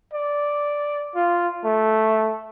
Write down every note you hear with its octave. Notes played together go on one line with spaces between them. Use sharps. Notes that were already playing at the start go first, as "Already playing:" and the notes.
D5
F4
A3